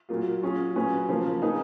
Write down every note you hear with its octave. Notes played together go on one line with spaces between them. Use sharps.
A#2 F#3 A#3 F4
F#3 C#4 F4 G#4
A#2 F#3 C#4 G#4 B4
C#3 F3 A#3
A#3 D#4 G#4 B4